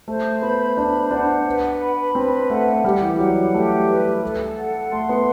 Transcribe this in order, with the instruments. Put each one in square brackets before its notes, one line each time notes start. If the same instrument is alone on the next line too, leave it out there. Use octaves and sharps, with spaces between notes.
[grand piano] A3 [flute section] C5
[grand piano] B3 [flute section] B5
[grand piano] D4 [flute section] C5
[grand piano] D4 [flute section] F#5
[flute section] B4
B5
[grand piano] C4 [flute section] B4
[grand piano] A3 [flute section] F#5
[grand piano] G3 [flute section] G4
[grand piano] E3
[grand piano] F#3 [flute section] F#5
[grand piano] F#3
[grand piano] A3 [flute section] G4
[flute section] B4
A4
F#5
[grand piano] A3 [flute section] C6
[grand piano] B3